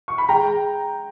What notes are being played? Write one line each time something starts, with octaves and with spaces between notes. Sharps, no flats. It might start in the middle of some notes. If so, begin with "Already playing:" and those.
C#6
B5
G#3 G5 A#5